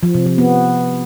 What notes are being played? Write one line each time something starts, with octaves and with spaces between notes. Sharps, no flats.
F3
C3
F3
B3